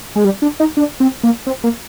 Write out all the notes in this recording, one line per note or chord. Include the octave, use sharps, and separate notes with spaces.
G#3
G3
D4
D#4
D4
C4
A#3
C4
A#3